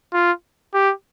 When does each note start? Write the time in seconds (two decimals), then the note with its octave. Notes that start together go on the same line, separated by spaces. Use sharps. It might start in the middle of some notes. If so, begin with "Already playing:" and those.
0.13 F4
0.74 G4